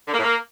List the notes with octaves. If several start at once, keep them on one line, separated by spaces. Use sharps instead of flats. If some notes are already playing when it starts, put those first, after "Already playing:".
D3
A#3
A2
A#3